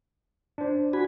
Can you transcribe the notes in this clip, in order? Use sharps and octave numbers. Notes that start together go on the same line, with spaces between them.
D4 C5
F#4 G#5 B5